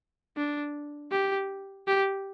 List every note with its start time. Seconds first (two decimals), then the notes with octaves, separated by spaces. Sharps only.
0.36 D4
1.11 G4
1.87 G4